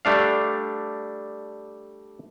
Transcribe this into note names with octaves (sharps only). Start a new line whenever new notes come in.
G3 A3 D4 F5